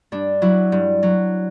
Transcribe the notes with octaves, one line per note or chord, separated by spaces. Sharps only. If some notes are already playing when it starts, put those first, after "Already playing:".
G2 D4
F#3 E4
G2
F#3